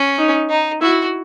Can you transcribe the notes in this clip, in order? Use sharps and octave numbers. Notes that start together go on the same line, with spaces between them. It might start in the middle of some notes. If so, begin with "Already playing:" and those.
Already playing: C#4
D#4
D#4
E4 F#4